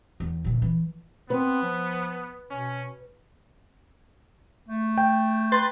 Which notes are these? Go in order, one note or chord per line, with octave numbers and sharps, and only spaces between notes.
E2
A#1 D3
E3 E4
B3 C4 B4
F3
B2 C#4
A3
G5
B4 C6 A6